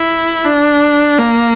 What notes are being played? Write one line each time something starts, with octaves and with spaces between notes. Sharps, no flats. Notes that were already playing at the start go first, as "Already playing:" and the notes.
Already playing: E4
D4
A#3